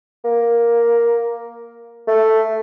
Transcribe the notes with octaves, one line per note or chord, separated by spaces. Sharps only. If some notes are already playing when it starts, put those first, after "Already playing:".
A#3
A3